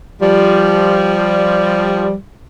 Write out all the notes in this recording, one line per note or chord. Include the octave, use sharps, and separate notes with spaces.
F3 G3